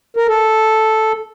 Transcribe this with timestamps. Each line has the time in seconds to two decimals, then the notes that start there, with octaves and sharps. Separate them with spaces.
0.16 A#4
0.28 A4